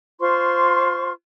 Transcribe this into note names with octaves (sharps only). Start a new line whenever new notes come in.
F4 C5 C6 C#6